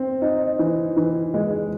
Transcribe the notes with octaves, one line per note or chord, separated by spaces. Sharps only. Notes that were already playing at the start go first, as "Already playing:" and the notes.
Already playing: C4
D#4
E3
E3
G#3